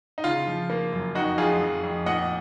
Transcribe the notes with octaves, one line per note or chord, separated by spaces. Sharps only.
D#4
C#3 F4
F3
A#3
F#2
F2 D#4 F#4
F2 F4 G#4
F2
F2
A#2 D#5 F#5